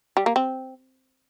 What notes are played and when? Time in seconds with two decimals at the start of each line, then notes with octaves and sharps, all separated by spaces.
0.17 G3
0.26 A#3
0.36 C4